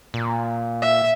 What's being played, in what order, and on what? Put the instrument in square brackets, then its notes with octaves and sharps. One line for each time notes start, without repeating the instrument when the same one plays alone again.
[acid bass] A#2
[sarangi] E5